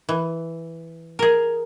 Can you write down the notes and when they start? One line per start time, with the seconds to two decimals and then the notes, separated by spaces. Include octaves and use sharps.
0.09 E3
1.19 G#4 A#4